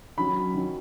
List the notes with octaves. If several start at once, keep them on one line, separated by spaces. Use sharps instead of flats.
D#3 F#3 C#4 B5
D#3 F#3 C#4